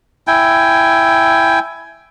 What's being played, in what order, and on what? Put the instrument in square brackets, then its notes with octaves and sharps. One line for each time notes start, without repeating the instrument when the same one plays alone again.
[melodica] E4 G5 G#5